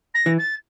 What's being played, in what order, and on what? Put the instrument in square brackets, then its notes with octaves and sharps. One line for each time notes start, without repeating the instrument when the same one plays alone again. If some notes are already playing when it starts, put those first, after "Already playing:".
[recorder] A#6
[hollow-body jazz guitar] E3
[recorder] A6